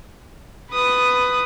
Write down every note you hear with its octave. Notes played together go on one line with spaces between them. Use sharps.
B4 D#6